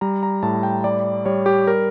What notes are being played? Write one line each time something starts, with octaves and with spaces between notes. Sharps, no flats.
G3 A#5
A#5
A2 A5
G5
G3 D5
G3 C#5
G4
A#4